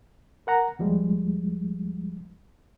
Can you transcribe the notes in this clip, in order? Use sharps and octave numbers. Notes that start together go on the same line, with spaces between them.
A#4 F#5 A#5
D#2 F3 G3 G#3